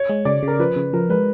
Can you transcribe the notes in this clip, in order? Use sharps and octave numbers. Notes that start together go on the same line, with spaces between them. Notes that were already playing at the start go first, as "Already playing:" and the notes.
Already playing: C#5
G#3
C#3 D5
C#3 A#4
F3 B4
C#3
F3 A#4
G#3 B4